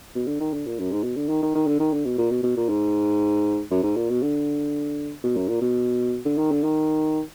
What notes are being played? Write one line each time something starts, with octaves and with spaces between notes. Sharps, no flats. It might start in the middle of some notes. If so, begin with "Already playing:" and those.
B2
D3
D#3
D3
A#2
F#2
G#2
B2
D3
D#3
D#3
D#3
D3
D#3
D3
B2
A#2
B2
B2
A#2
G#2
F#2
G#2
A#2
B2
D3
B2
F#2
A#2
B2
D3
D#3
D3
D#3